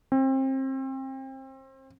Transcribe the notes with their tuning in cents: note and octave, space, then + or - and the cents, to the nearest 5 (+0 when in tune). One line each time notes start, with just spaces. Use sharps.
C4 +30